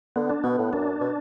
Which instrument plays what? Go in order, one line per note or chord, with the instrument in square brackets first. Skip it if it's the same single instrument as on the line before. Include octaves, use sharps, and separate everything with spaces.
[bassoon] D3 [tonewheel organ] B3
[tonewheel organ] D4
[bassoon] B2 [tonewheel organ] B3
[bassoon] A2
[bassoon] F#2 [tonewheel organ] D4
[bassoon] B2